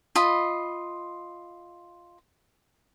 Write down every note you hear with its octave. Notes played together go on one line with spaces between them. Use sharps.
F4 D#5 B5